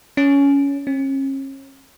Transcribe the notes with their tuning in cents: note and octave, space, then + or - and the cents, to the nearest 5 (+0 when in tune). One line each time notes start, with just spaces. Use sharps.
C#4 +15
C#4 -40